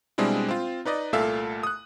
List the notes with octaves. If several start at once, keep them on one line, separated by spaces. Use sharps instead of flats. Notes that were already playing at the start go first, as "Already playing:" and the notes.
B2 G3 G#3 C4 D4 E4
C4 F4
D#4 B4 D5 D#5
C2 A#2 A3 A4 E5 F5
D#6 F#6